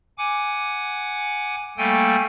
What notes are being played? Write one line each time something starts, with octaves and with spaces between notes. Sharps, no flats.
F#5 G#5 D6
G3 A3 A#3 A4 G5 G#5